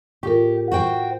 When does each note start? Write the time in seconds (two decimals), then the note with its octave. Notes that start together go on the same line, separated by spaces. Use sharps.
0.23 A2 F4 G4 A#4
0.71 F#4 C5 G5